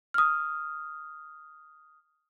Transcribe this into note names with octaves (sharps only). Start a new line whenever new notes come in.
D#6 F6